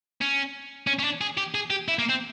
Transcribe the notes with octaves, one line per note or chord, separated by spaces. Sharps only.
C#4
C#4
C#4
D4
G#4
G4
G#4
G4
E4
A#3
C4